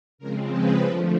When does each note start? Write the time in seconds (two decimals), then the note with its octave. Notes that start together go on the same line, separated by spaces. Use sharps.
0.18 C#3 F3 G#3 C4 A#4
0.51 B4
0.83 D3 F3 A3